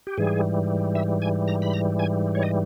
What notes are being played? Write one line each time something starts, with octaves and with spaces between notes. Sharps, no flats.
G4
G#2 E3 G3 G#4
E5
G#5
A#5
B5
A#5
G#5
C#5
D#5